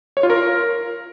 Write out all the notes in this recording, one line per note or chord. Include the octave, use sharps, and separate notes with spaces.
C#5
F4
A#4